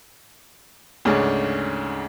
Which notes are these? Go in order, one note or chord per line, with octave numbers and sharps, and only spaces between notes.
D2 G#2 C#3 C#4 D4